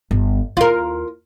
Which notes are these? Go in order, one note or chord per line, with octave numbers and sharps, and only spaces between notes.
G1
D#2 F4 A#4